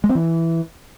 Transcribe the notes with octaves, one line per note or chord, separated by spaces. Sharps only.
G#3
C4
E3